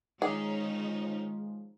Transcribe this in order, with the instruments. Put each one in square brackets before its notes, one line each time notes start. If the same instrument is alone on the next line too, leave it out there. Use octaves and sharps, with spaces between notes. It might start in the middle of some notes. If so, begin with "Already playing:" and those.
[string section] D#3 C#4 D#4 [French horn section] F3 G#3 [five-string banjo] G#4